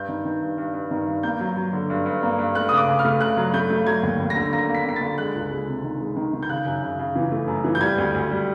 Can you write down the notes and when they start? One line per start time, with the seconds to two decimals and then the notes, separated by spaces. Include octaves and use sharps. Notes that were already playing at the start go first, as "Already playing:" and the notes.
Already playing: G2 G6
0.09 D#3
0.25 D#3
0.42 G2
0.58 G2
0.74 G2
0.91 D#3
1.07 G2
1.23 A#3 G6
1.40 F#3
1.57 F#3
1.73 D3
1.90 G2
2.06 G2
2.23 A#3
2.39 G2
2.55 A3 F#6
2.69 C#3 D#6
2.77 D6
2.88 C#3
2.99 F6
3.05 A3
3.21 C#3 F#6
3.37 F#3
3.54 A3 G6
3.70 A3
3.86 F#3 G#6
4.03 D#2
4.19 D#2
4.30 A#6
4.36 D3
4.53 A#3 A#6
4.69 A#3
4.75 B6
4.85 A#3 B6
4.96 A6
5.02 D3
5.18 G#3 F#6
5.34 C#2
5.51 G#3
5.67 C3
5.84 D#3
6.01 G#3
6.16 D#3
6.33 D#3
6.43 G6
6.49 C#3 F#6
6.66 F#2
6.83 C#3
6.99 C#3
7.15 E3
7.32 A3
7.48 F#2
7.64 E3
7.75 G6
7.81 G3 G#6
7.98 D2
8.15 D2
8.31 G3